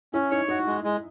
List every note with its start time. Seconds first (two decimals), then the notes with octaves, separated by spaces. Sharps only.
0.14 C#4 E4
0.31 D#4 C#5
0.48 D#4 F#4
0.66 G#3
0.84 G#3